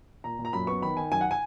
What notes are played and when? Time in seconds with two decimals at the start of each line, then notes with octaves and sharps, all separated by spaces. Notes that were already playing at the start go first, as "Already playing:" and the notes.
0.24 A#2 A#5
0.39 A#2
0.45 A#5
0.53 F#2 B5
0.67 B3 C#6
0.82 D#3 B5
0.96 D#3 G#5
1.12 F#2 G#5
1.21 F#5
1.31 G#5